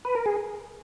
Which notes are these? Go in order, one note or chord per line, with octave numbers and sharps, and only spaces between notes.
B4
A#4
G#4